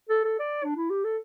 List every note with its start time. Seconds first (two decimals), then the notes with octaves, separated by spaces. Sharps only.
0.09 A4
0.24 A4
0.39 D5
0.64 D4
0.76 E4
0.90 G4
1.04 A4